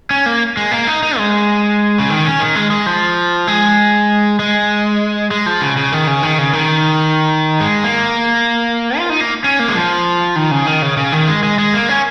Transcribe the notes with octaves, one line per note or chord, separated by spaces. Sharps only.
C#4
A#3
G#3
A#3
D#4
D#4
G#3
C#3
D#3
C#4
D#3
G#3
G#3
F3
G#3
G#3
G#3
F3
C#3
C#3
D#3
C#3
D#3
C#3
D#3
G#3
A#3
F4
D#4
A#3
C#4
A#3
G#3
F3
D#3
C#3
D#3
C#3
C#3
D#3
G#3
G#3
G#3
A#3
C#4